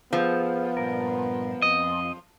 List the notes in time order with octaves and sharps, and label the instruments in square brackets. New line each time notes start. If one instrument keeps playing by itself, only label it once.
[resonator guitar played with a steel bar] F3 [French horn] B3 [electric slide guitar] G#4 A4 C5
[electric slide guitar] G2 A#2 A#4
[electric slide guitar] F2 [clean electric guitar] D#5